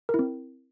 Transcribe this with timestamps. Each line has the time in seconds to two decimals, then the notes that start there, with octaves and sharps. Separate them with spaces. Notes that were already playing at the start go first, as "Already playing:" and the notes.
0.09 A#4
0.14 E4
0.19 C4